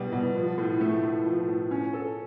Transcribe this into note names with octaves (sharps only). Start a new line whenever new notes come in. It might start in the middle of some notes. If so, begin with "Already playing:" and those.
Already playing: B2 G3
B2
F3
A2
A3
A2
F3
A2
C#4
A4